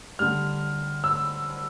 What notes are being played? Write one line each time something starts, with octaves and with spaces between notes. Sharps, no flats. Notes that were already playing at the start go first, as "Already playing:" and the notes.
D3 G3 F6
E6